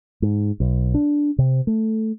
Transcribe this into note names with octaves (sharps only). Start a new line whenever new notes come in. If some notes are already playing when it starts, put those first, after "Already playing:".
G#2
B1
D4
C3
A3